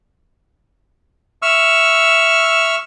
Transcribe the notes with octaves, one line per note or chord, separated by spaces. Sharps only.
E5 C#6 E6 F6